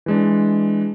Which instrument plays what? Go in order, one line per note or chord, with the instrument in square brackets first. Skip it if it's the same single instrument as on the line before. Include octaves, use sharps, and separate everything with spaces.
[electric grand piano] E3 G#3 D4